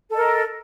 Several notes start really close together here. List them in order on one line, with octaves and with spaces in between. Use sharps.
A4 D#5 A#4